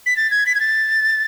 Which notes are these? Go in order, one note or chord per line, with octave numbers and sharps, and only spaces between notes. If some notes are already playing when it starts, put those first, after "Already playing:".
B6
A6
G#6
B6
G#6
A6